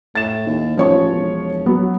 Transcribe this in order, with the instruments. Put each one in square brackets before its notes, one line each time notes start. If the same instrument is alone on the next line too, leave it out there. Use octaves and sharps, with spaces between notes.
[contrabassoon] A2 [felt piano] A6 E7
[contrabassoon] D#2
[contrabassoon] A1 [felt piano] F3 C#5 C#6
[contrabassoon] E1
[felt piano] F#3 B3